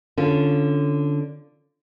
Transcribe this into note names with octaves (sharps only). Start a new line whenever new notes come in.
D3 C#4 F4